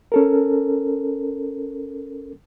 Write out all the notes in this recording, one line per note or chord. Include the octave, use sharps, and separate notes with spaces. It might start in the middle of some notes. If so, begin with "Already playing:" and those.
C#4 A4 A#4